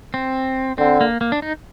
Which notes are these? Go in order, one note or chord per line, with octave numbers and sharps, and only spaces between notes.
C4
D3 C4
A#3
A#3
D4
D#4